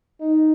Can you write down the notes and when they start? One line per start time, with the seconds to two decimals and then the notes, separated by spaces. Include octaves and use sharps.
0.21 D#4